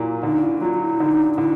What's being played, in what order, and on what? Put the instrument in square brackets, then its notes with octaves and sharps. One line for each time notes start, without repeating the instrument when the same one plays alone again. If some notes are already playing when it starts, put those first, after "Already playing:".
Already playing: [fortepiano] A#2 F#3 [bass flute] E4
[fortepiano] D3 [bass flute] D#4
[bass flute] E4
[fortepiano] F#3 [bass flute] F4
[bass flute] F4
E4
[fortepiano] D3 [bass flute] D#4
[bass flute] D#4
[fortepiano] D3 [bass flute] E4